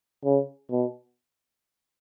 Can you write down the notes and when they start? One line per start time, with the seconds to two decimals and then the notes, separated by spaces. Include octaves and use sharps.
0.25 C#3
0.71 B2